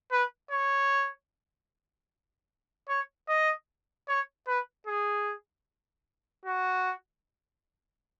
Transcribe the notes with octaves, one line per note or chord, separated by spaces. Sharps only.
B4
C#5
C#5
D#5
C#5
B4
G#4
F#4